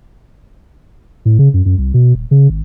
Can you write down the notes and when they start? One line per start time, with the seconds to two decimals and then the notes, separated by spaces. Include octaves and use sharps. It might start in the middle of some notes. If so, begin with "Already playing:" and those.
1.25 A2
1.39 C#3
1.54 F#2
1.66 F#2
1.78 C2
1.94 B2
2.15 D#1
2.31 C#3
2.50 G#1